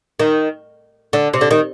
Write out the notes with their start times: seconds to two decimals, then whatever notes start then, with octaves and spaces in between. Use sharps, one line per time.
0.19 D#3
1.13 D3
1.34 C3
1.41 D3
1.51 D#3